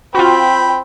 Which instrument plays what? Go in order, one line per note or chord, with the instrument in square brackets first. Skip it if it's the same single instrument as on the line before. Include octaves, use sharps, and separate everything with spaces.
[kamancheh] C4 [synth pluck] F4 F#4 [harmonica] G5 B5